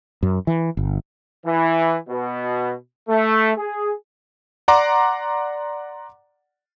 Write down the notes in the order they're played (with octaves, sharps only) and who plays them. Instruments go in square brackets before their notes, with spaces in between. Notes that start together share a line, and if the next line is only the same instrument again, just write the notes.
[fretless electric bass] F#2
E3
G1
[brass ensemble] E3
B2
A3
G#4
[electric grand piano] D5 F#5 A#5 C6 D6